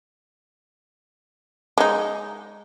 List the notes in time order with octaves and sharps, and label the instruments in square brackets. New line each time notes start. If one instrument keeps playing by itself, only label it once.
[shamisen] G#3 D#4